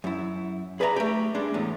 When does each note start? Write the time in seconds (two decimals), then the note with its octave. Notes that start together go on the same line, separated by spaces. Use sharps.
0.04 F#2 E4
0.80 G#4 B4 D5 E5 G#5 A#5
0.96 A3 G4
1.35 G3 G#3 D4
1.54 E2 A2